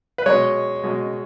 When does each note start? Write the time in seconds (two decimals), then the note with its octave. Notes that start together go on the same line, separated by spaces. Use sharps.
0.18 B4
0.26 B2 G#3 C#5
0.84 B2 G#3